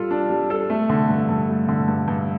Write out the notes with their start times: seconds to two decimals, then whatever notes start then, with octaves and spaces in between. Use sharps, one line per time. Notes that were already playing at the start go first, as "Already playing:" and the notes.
Already playing: G3 F4 A4
0.11 D4
0.30 G3
0.50 A4
0.70 A3
0.90 D3
1.09 G2
1.29 G2
1.49 A3
1.69 D3
1.88 G2
2.08 G2